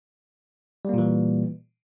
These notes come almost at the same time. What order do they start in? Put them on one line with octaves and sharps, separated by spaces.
G3 A#3 A#2 E3